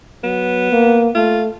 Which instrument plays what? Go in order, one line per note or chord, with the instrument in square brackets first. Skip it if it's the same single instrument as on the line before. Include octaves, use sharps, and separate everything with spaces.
[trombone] F#3 [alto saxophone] B3
[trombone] A#3
[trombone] A3 [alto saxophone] F4